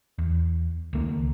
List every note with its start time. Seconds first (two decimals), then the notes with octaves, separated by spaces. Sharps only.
0.18 E2
0.93 C#2 D#3 A3 A#3